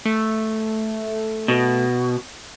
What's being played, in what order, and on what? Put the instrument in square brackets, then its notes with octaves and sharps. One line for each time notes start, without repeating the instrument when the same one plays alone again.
[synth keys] A3
[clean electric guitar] B2